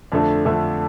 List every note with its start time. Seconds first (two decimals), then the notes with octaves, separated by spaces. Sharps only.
0.12 F2 D3 A3 D4 A4
0.45 F2 D3 A3 D4 A4